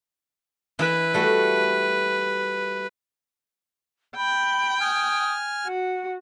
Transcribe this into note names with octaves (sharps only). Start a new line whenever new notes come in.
E3 E4 B4
G3 A3 F#4
G5 B5
G#5 D#6 F6
F#4 F#5